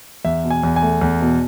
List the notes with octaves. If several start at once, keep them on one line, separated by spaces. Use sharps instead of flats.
E2 E5
B2
G#5
E2
G#5
A3
E2
B2